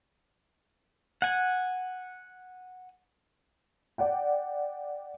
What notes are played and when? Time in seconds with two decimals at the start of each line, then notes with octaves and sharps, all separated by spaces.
1.22 F#5 G#5
3.98 D5 F#5 G5